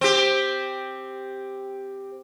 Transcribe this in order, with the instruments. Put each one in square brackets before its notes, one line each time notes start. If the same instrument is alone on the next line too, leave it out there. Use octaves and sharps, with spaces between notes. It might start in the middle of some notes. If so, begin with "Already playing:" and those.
[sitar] C4 G4